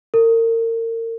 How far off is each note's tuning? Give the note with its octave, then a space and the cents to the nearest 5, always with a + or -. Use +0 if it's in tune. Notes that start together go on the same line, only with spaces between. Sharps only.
A#4 -35